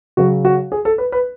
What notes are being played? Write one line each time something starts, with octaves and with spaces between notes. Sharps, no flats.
C#3 F#3 F#4
F#4
G#4
A4
B4
B4